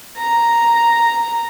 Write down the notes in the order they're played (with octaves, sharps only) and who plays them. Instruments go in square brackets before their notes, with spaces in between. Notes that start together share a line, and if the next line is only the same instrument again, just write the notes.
[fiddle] A#5